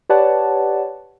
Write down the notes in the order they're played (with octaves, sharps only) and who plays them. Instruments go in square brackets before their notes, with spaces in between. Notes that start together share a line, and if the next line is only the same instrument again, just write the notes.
[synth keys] G4 B4 C#5 D5 F#5 A5